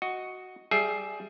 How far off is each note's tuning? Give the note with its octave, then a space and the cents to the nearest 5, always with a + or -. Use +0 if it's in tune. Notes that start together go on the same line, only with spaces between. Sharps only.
F#4 +0 D#5 +10
G3 +0 G#4 +20 E5 +0